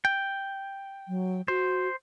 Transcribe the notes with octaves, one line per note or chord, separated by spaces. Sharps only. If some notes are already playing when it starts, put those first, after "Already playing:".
G5
F#3
F#4 C5